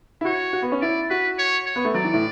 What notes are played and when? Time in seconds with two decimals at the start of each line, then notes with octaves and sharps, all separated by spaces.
0.21 E4
0.25 F#4 C#5
0.53 F#4
0.62 B3
0.72 C#4
0.81 E4 D5
1.10 F#4 B4
1.38 C#5
1.66 C#5
1.76 B3
1.85 A3
1.95 F#3 D5
2.04 E3
2.13 A2